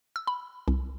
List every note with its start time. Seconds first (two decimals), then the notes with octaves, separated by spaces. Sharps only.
0.16 E6
0.27 B5
0.68 C2